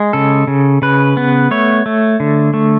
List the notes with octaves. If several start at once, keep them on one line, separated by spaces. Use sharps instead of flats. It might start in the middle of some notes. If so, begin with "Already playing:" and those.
Already playing: G#3
C#3 A4
C#3
C#3 B4
B3
A3 C#5
A3
D3
A3